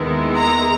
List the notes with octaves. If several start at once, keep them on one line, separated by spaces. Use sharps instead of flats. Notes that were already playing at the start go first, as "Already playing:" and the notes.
Already playing: D#2 D#3 G#3 B3 E4
A#5